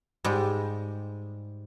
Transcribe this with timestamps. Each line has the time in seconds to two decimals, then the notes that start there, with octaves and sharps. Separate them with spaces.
0.24 G#2 G3 G#3